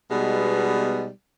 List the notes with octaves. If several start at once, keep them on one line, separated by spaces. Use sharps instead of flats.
B2 G3 G#3 B3 D#4